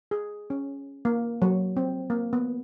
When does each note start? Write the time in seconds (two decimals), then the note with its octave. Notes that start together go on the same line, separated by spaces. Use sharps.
0.11 G#4
0.50 C#4
1.05 A#3
1.42 F#3
1.77 C4
2.10 A#3
2.33 B3